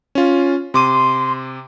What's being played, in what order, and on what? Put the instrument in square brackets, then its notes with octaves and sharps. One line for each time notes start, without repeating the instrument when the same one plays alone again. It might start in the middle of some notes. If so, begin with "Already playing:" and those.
[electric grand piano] C#4 F4
[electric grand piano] C3 D6 D#7 [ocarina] C6